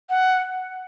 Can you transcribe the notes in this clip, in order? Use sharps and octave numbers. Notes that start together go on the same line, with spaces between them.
F#5